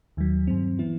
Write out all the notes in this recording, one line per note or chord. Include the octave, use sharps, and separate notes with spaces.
D#2 D#3 F#3
G2 F#3 C4
E3 B3 E4